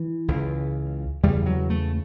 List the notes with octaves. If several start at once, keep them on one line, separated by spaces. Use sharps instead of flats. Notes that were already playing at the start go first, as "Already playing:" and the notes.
Already playing: E3
C#2 C#3
E2 C#3 G3
F#3
A3